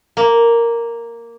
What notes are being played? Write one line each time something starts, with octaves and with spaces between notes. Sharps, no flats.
A#3